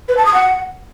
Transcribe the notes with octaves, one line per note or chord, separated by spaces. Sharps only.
B4
A5
D#6
F#5